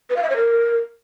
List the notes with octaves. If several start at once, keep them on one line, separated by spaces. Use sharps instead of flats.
B4
F5
E5
C#5
A#4